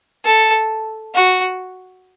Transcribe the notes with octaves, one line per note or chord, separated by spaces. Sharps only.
A4
F#4